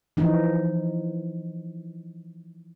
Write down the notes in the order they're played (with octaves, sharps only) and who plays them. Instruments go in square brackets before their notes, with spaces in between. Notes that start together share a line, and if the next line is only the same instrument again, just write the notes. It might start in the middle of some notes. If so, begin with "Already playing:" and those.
[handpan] E3 F3 D#4